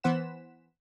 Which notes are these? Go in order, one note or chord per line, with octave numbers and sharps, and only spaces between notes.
E3 B3 C5 F#5 B6 E7